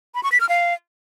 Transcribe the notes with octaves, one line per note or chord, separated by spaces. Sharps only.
B5
C#6
B6
F6
F5